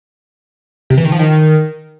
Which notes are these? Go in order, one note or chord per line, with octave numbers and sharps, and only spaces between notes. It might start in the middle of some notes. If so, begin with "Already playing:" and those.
C3
E3
D#3
F3
D#3